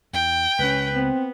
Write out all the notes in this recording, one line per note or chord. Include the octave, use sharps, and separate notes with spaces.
E2 G5
C#2 C#4 B4
B3 C4